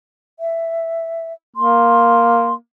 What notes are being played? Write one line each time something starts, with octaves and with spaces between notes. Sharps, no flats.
E5
A#3 C6